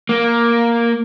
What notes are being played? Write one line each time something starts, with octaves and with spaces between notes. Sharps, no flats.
A#3